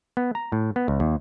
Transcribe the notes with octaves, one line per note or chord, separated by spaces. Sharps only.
B3
A#5
A2
B3
C#2
D#2